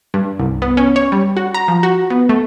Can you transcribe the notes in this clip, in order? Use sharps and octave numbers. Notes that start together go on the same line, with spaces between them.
G2
C2
B3
C#4
C#5
G3
F#4
A#5
F3
F#4
B3
A3